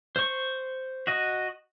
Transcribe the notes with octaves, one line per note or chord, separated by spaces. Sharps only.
C5 C#6
F#4 D#5